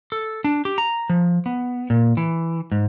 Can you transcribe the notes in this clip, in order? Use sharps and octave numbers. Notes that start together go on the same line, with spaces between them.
A4
D4
G4
A#5
F3
B3
A#2
E3
G#2